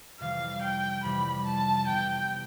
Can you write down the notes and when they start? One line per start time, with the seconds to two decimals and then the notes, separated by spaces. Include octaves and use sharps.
0.20 F2 C3 E3 G3 F5
0.62 G5
1.04 F2 C3 E3 G3 B5
1.46 A5
1.87 C3 E3 B3 G5